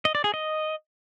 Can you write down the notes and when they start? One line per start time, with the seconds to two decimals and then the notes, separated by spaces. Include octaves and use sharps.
0.05 D#5
0.15 D5
0.24 G#4
0.34 D#5